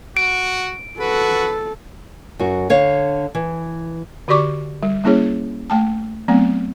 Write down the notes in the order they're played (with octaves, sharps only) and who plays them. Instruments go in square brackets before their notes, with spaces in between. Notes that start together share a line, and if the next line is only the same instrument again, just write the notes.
[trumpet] F#4 [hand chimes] D7
[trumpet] F#4 [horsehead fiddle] A4 [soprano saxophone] B4
[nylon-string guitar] F#2 F#4
D3 C#5 F5
E3
[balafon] D3 F#4 G4 D5 C#6 D6
G3
G3 A#3 C#4 E4 G#4 C#5
A3 G5 A5
F#3 A3 B3 C4